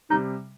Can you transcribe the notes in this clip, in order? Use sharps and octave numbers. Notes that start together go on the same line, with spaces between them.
C3 G3 D#4